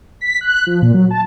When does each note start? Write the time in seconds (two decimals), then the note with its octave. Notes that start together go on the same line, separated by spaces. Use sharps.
0.21 B6
0.41 F#6
0.67 F3
0.82 A#2
0.94 F#3
1.11 A5